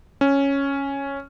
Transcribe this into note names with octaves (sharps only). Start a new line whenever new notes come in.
C#4